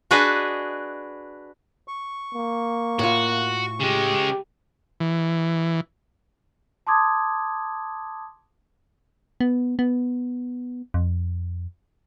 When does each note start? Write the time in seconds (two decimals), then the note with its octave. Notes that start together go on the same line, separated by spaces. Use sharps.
0.11 D4 F#4 G#4 B4 D#5
1.88 C#6
2.35 A#3
2.99 A2 F4 F#4
3.80 C#3 G#3 G4
5.00 E3
6.87 A5 C6 D6 D#6 G#6
9.41 B3
9.79 B3
10.94 F2